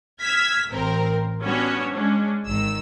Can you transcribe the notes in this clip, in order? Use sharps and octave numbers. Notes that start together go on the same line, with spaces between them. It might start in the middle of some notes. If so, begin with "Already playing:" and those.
E6 F6 G#6 B6
A1 C4 A#4
G3 B3 C#4 D4 F#4 C#5
G#3 C#4 D4
G#1 D#3 E6